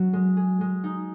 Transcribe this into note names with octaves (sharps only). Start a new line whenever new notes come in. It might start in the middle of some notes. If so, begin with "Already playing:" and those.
Already playing: F#3 C#4 F#4
G#3
G#4
G#3
D#4